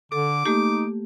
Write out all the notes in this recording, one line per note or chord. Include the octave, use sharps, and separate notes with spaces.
D3 A4 D6
A3 A#3 D#4 G4